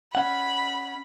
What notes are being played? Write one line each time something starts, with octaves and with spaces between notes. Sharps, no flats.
C#4 F#5 B5